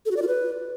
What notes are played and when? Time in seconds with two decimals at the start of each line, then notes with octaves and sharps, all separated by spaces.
0.06 A4
0.11 F#4
0.17 D5
0.22 F4
0.28 B4